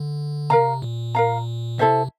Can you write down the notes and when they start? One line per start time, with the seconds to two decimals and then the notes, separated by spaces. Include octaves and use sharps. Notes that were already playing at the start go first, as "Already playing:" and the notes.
Already playing: D3
0.50 C3 A#4 F5 A#5
0.82 A#2
1.15 A#4 F5 A#5
1.78 C3 E4 A4 C5 E5